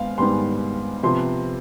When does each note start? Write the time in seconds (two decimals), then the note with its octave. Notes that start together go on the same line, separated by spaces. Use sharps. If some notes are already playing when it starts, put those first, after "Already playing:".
Already playing: G#2 B3 F5
0.18 G#2 D#3 G3 B3 C6
1.03 C3 F3 B3 C6